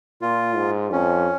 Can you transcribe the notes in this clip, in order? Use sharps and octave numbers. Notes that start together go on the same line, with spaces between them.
A#2 F4
G#2
F2 C#4